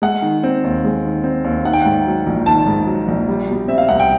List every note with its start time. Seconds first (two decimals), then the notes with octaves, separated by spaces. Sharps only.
0.02 G#3 F#5
0.22 D#3
0.44 C4
0.64 D#2
0.84 G#3
1.04 D#3
1.24 C4
1.44 D#2
1.65 D#3 F#5
1.73 G5
1.82 G#2 F#5
2.06 F#3
2.27 A#1
2.46 D#3 A5
2.66 G#2
2.87 F#3
3.08 A#1
3.28 G3
3.48 B2
3.68 C4 E5
3.78 F5
3.89 C2 F#5
4.00 G5